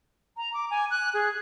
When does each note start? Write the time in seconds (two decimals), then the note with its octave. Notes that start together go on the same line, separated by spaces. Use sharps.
0.37 A#5
0.54 D6
0.70 G#5
0.90 F#6
1.14 G#4